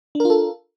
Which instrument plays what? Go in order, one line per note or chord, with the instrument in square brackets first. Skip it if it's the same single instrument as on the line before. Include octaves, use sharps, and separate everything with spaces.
[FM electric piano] D4
A#4
F4
A4